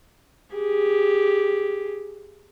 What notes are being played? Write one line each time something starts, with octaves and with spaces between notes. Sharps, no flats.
G4 G#4